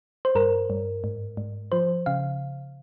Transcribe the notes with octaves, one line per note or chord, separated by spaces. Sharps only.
C5
G2 A#4
G2
G#2
G#2
F3 C5
C#3 F5